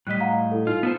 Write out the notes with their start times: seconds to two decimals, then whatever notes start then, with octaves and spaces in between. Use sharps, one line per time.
0.07 A2 G3 D#5 F#6 B6
0.20 F5 F#5 A#5
0.52 E4 A4
0.67 D#4 F4
0.83 B3 A4 C5